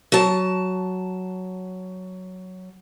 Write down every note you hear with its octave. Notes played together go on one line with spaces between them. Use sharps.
F#3 A5